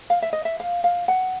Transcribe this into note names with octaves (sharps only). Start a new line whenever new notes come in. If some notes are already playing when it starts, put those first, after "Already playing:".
F5
E5
D#5
E5
F5
F5
F#5